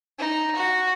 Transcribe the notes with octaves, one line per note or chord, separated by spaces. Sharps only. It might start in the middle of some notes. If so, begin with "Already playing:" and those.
D#4
F#4